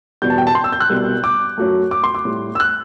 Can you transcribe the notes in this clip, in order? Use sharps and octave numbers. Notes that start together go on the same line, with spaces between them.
E2 B2 G3 G6
A5
G5
A5
C6
E6
G6
F#6
C2 B2 G3
D6
F#2 F#3 A3
D6
C6
D6
A2 G3
E6
F#6